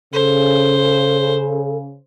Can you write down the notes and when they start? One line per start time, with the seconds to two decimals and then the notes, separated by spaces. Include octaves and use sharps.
0.13 C#3 A4 C5